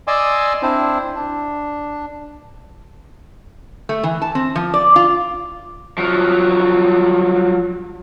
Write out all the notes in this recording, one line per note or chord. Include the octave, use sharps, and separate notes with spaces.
D5 D#5 G#5 C6 D6 E6
C4 D4 E4 C5
D4
A3
E3
A5
C4
F3
D5
F4
F3 F#3